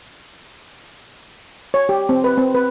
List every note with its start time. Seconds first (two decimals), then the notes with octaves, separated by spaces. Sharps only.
1.74 C#5
1.89 G4
2.09 C4
2.24 B4
2.37 C4
2.55 B4